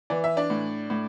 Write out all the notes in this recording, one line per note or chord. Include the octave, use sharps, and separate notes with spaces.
E3 D5
E5
D4 D5
A2
A2